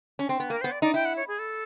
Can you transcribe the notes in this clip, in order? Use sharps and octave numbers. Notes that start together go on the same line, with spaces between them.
C#4
C4
B3
A#3 A#4
C5
B3
D5
D#4 D5
E4 G5
F#5
C#5
G#4
A4